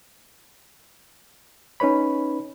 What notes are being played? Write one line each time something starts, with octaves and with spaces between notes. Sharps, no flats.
C#4 D#4 B4 C#5 B5